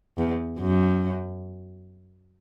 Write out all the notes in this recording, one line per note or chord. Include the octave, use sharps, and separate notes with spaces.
E2
F#2